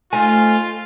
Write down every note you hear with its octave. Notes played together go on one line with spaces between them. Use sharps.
A3 C4 D#4 F4 G#5